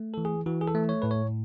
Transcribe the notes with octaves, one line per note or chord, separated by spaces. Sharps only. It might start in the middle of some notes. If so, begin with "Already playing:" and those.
Already playing: A3
E3 A4
G#4
E3 F#4
G#4
A4
A3
C#5
A2 B4
C#5